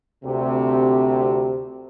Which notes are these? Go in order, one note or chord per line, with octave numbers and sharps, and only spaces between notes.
D2 C3